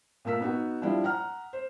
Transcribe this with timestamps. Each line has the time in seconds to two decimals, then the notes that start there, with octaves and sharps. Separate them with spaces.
0.25 A#2 A3 A#4 E6 B6
0.40 B3 D#4 F#4
0.82 F3 G3 D4 E4
1.04 F#5 A#5 F6
1.53 C5